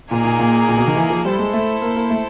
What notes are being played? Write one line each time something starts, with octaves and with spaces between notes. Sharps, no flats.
A#2 A#3 D#4 G#4
A#2
A#2
A#2
B2
D#3
E3
F3
G3 E4 A4 C5
G#3
A3
A#3
A#3
A3